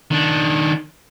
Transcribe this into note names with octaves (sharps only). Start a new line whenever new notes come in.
D#3 D4